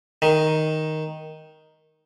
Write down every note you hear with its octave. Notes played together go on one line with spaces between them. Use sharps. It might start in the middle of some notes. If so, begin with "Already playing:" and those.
D#3